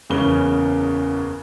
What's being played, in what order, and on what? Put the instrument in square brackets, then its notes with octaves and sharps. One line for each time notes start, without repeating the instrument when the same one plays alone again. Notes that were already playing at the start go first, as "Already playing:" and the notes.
[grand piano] F#1 E2 C#3 C#4 B4 G7